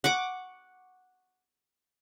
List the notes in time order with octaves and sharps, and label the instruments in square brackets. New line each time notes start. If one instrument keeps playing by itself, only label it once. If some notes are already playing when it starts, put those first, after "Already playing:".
[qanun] F#5 C#6 D6